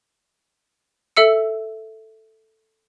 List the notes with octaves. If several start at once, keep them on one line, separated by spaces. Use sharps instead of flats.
A4 E5 E6 C#7